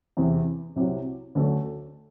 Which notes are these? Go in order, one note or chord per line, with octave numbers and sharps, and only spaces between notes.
E2 C3 E3
C2 C3 F#3
D2 D3 F#3 A3 D4